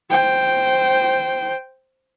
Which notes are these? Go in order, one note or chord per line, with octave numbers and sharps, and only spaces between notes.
C5 G5